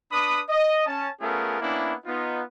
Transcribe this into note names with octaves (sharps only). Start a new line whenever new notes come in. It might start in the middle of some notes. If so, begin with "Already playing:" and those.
D4 B4 B5 D#6
D#5
C#4 A5
A3 B3 C#4 F4 G#4 A#4
A#3 B3 C#4 D4 E4
B3 D#4 F4